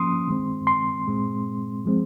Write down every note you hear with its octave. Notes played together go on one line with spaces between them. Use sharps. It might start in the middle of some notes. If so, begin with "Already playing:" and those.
Already playing: F3 A#3 C#4 C6 D#6
D#3 G#3 C4
C6
A#2 G#3 C4
F3 G#3 C4